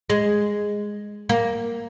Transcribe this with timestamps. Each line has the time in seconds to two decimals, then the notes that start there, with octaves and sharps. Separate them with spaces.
0.10 G#3
1.29 A#3